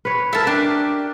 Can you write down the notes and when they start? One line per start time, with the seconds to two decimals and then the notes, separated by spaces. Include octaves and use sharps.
0.05 B4 C#5
0.33 E4 A4 A#4 A5
0.47 D4 G4 E5